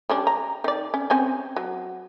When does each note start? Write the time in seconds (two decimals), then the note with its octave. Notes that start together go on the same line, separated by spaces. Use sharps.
0.09 G3 C#4 D4
0.27 A#5
0.64 D#3 D5
0.94 C#4
1.10 C4 C#4 G#5
1.56 F#3